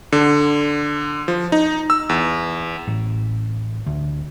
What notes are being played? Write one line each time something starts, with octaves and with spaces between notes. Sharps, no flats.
D3
F3
D#4
E6
E2
A1
D2